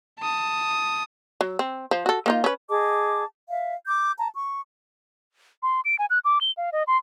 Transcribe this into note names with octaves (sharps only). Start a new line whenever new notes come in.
A5 D#6
F#3
C4
F3 C5
F#4 A4
A#3 D#4 F4
C#4 B4
G#4 D#5 A5 D6
E5 F5
D6 G6
A5 A#5
C#6
C6
D7
G#5
F#6
D6
G7
F5
D#5
C6